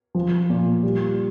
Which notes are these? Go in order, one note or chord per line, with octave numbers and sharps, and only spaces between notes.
F3
A#2
G3